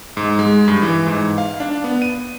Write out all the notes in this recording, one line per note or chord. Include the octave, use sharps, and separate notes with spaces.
G#2
G#3
G2
E3
G#2
F5
D4
B3
D#7